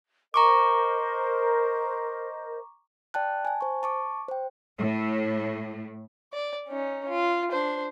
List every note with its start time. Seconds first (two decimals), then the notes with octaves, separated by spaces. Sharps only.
0.34 A#4 C5 D#5 A#5 C#6 D6
3.14 D5 G5 A5 F#6
3.45 G#5 A5
3.61 C5 C#6
3.83 A5 C#6 D6
4.28 C5 G5
4.77 A2
6.33 D5
6.68 C#4 D#4
7.09 F4
7.52 D4 C5